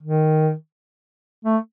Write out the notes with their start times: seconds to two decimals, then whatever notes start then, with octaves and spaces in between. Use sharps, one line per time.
0.03 D#3
1.45 A3